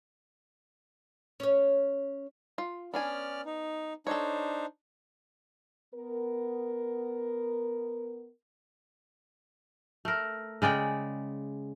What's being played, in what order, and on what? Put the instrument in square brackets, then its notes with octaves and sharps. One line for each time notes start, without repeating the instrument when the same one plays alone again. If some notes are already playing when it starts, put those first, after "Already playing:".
[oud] C#4 C#5
[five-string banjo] F4
[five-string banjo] B3 D4 G#5 [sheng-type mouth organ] C#4 D5 F6
[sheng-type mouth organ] D#4
[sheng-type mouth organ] D4 D#4 C5 [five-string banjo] A4 C#5
[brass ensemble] B3 A#4
[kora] A3 A#4
C#3 G#3 D5 G5